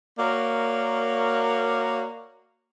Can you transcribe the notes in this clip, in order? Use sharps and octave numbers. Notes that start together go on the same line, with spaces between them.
A#3 F#4 A#4 C#5 D5